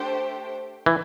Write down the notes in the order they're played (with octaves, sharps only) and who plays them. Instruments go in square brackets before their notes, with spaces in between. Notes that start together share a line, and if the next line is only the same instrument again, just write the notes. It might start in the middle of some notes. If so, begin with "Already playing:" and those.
Already playing: [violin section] A3 D4 G4 C5 G5
[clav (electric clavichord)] E3